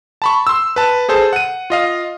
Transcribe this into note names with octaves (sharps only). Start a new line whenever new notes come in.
A5 B5 C#6
C6 E6
B4 A5
G#4 A4 C5 A5
F#5 D#7
F4 D#5 F5